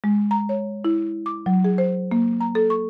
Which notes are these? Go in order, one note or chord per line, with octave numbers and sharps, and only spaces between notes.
G#3
A#5
C#5
E4
D6
F#3
G#4
C5
A#3
A#5
A4
C#6